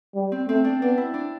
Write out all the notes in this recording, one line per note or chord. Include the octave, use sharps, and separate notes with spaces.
G3
C4
A3 C4
D4
B3 D4
E4
D4